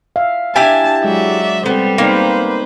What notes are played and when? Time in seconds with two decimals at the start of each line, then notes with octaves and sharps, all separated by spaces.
0.16 E5 F5
0.56 D4 E4 G4 G#5 A5
1.04 F#3 G#3 D5 E5
1.66 G3 B3 C4 A4 C5
1.98 A#3 B3 D#4 B4 C5 D5